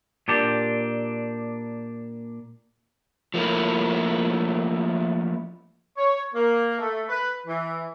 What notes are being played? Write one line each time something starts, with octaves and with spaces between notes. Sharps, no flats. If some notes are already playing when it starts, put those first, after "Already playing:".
A#2 D4 G4
F3 A3 A#3 E4
C#5
A#3
A3
B4
E3